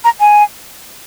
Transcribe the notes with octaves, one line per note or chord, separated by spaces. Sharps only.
A#5
G#5